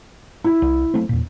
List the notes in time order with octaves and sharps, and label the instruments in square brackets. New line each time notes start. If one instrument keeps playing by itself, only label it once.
[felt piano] E4
[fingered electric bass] C2
F#3 A3 C4
E2 A#2